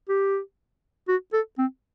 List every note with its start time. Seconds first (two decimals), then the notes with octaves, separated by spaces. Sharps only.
0.09 G4
1.08 F#4
1.33 A4
1.58 C4